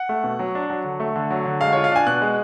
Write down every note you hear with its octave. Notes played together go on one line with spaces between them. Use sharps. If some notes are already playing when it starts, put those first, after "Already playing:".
Already playing: F#5
A3
B2
F#3
D4
F#3
D3
A3
D3
F#3
D3
G#3 F5
F4 C#5
F5
D4 G#5
B2 F#6
G#3